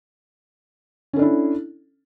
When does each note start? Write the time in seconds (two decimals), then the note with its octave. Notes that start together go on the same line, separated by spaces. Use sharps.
1.13 C#4
1.16 A4
1.19 D4
1.22 E4